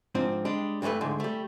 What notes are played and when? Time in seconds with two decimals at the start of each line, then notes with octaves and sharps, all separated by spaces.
0.15 G#2 F3 C4 D4
0.45 G3 G#3 D4
0.82 G2 E3 F3 A3 B4
1.01 D2 G#2 D3
1.20 G3 A3